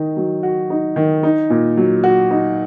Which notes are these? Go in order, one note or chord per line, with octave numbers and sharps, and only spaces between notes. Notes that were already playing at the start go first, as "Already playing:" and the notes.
Already playing: D#3 D#4
F#3
F#4
D#4
D#3
D#4
A#2
F#3
F#4
D#4